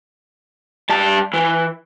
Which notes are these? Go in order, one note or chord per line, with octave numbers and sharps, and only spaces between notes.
G3 A5
E3